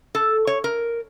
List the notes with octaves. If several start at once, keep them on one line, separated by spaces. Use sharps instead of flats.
A4
C#5
A#4